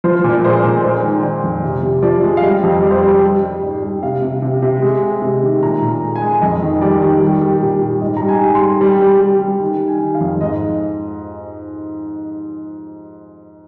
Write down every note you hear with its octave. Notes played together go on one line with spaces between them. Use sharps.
F3 C5
A#2
D5
G#3 C5
D5
A#2
G#3 C5
D#3
D#3 D5
F2
C3
C3
F3 D5
G#3
F5
G3 D#5
F2
G3 D5
C5
D5
G3
G3
G3
G#2 D5
G3
C3 F5
C3
C3
C3
G#3
G#3
C3
D#3
A#2 A#5
A#2
A#5
G#3
G#5
G#3
F2 D#5
D#3
G3 D5
D#3
G3
G3
A#2
G3
G#2 D#5
A#5
G3
G#5
G#2
C6
G3
G3
G3
G3
G3
D#3
D#3
G#5
D#3
F5
F2
G#2 D#5